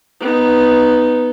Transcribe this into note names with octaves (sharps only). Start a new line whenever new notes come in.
B3 D#4